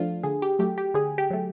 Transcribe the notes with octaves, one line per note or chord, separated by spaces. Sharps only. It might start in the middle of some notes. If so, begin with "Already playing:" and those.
Already playing: F3 A3 D4 F4
D3 G#4
G4
F#3 A3 G4
G4
D3 G#4
G4
F#3 A3